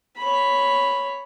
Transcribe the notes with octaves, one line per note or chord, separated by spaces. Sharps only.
C#5 B5